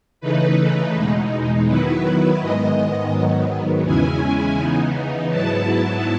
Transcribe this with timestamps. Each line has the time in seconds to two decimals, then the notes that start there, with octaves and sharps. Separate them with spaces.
0.21 C#3 E3 A3 D#4 B4
0.94 E2 B2 G#3 D#4
1.67 D#3 F#3 B3 E4 B4
2.39 G#2 D#3 G#3 B3 D#5
3.12 G#2 D#3 F#3 B3
3.85 E2 C#3 G#3 C#4 E4 G#5
4.58 C#3 E3 B3 D#4
5.30 G#2 F#3 B3 E4 A5